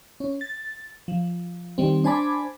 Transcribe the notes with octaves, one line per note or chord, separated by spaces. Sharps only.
C#4
A6
F3
D#3 G3 C4
D4 C5 G#5 A5 B5 D6